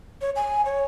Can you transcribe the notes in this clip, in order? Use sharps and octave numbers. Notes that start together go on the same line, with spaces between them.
C#5
G#5
C#5